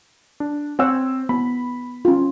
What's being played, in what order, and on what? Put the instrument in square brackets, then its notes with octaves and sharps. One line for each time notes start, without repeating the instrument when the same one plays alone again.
[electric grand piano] D4
[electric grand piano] C4 E6 [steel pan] C#5 F#5 G#5
[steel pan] B3 [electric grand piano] B5
[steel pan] C#4 F4